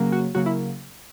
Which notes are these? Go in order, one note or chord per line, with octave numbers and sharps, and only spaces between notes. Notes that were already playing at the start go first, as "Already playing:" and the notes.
Already playing: C#3 F#3 A#3
F#4
C#3 F#3 A#3 F#4
E4